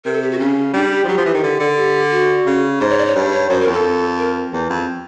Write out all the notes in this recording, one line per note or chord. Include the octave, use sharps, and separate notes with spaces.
C3 A#4
A4
G4
F#4
C#3 C#4
G3 D4
G4
F3
F#3 G4
F3
E3
D#3
D3
D3
G4
F#4
C#3
G#2 C5
C#5
D5
C#5
G2
C#5
F#2 C5
A#4
F2
A4
A#4
E2
F2